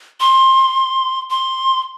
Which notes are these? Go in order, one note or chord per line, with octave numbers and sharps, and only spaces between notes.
C6
C6